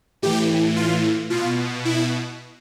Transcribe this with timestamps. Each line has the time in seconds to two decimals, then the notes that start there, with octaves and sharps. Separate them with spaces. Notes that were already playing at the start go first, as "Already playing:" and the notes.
0.22 A2 E3 G4
0.76 F4
1.30 B2 F4
1.85 E4